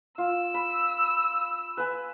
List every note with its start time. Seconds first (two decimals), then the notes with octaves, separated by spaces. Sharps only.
0.18 F4 E6
0.54 B5
1.77 B4 G#5